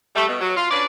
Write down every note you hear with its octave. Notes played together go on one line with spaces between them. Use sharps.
G3 A3
B2
F#3
F4
C#4 D4 B4 D5